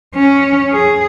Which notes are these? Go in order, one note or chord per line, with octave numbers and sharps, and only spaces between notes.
C#4
G#4